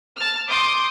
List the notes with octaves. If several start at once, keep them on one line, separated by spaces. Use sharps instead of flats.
A5 F6
C6 D6 D#6 G6